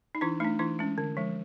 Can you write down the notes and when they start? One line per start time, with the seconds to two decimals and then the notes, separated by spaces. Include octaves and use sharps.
0.15 D#4
0.21 E3 D4 E4
0.40 A3 D4 D#4
0.59 E3 D4 E4
0.79 G#3 C#4
0.98 D3
1.17 F3 G#3